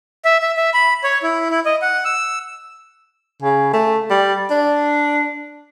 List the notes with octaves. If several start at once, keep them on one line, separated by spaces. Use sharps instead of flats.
E5
E5
E5
B5
C#5
E4
E4
D#5
F#5
E6
C#3
A3
G3
D4